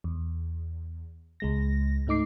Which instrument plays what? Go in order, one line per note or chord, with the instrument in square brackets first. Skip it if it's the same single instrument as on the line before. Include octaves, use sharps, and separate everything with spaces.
[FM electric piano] E2
C#2 G#3 A#6
G#2 A3 D#4 D6 C7